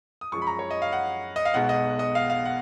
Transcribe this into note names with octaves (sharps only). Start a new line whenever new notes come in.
D#6
F#2 F3 G#3 C#6
B5
A#5
C#5
D#5
F5
F#5
D#5
F5
B1 B2 G#3 F#5
D#5
D#5
F5
F5
F#5